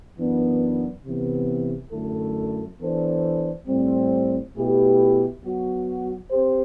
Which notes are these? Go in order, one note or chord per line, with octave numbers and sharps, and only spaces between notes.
F#2 E3 B3 D4
C3 E3 B3
F#2 D3 A3 E4 A4
E3 B3 D4 A4 C5
A2 G3 C4
B2 A3 E4 G4 B4
F#3 B3 F#4
C4 G4 C5